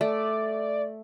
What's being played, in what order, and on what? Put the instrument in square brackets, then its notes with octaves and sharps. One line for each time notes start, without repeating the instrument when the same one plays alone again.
[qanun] A3 [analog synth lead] D5